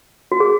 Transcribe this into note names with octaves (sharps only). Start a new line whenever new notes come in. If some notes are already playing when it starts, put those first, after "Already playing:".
F#4
G#4